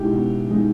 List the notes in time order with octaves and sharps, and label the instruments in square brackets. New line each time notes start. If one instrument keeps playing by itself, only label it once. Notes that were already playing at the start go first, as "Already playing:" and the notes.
Already playing: [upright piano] B2 G#3 D#4 E4 G4
B2
G#3 D#4